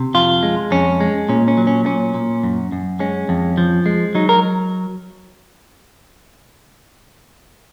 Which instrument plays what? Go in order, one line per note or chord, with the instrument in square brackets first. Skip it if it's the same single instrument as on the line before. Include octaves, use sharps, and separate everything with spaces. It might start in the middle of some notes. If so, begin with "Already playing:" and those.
Already playing: [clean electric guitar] C3
F2 F4
G#3
F2 C#4
G#3
A#2 C#4
C#4
F#3
C#4
A#2 C#4
A#2
F#2
F#2
G#3 C#4
F2
F3
G#3
F#3 D#4
A#4